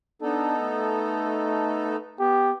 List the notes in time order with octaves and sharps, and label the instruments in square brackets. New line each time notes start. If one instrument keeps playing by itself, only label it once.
[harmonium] B3 D#4 A4 [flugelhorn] D4
[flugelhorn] A3
[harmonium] B3 [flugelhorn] G4